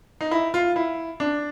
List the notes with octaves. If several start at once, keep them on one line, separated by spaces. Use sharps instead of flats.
D#4
E4
F4
E4
D4